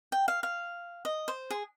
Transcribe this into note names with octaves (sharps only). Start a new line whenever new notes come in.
G5
F5
F5
D#5
C5
G#4